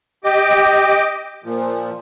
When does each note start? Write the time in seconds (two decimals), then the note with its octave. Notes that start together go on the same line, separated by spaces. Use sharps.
0.24 G4 D#5 G5 D6
1.44 A#2 F3